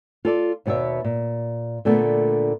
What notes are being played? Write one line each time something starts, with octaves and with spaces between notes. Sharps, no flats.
F4 A4 D5
D#2 B2 B3 D5 E5
A#2
A#2 D3 A3 B3